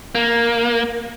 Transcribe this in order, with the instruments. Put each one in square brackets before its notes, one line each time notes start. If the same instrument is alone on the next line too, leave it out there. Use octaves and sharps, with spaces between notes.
[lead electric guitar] A#3